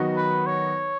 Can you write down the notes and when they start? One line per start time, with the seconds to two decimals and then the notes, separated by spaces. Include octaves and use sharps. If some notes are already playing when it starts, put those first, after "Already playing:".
Already playing: D#3 F#3 B3 D#4 F#4
0.17 B4
0.47 C#5